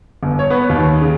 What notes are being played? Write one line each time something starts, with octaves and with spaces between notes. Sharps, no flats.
G1
C#5
B3
D#2
C#3